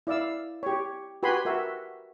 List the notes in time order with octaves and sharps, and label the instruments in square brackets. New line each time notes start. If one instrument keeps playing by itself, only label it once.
[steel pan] E4 D5 F5 E6
G4 C#5
F#4 G4 B4 G#5 B5 C6
F#4 A#4 E5